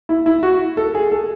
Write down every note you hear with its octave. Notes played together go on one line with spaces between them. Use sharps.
E4
E4
F#4
A4
G#4
A4